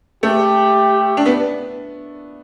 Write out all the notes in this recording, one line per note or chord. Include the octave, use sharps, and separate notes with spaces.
A3 G4
D4
B3